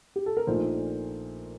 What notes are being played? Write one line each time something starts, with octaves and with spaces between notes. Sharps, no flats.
G4
A4
A#4
A#1 A#2 A3 D#4 C5